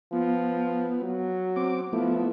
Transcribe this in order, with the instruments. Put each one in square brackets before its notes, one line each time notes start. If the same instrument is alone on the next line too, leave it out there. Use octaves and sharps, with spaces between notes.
[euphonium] F3 [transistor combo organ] B3
[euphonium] F#3
[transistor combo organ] C4 D6
[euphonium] F3 [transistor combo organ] A3 B3 E4